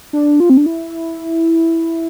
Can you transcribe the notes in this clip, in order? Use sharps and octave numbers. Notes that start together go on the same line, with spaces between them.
D4
F4
C4
D4
E4